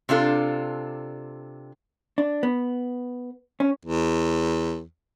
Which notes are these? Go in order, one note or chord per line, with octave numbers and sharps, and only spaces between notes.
C3 D4 F4 A4
D4
B3
C#4
E2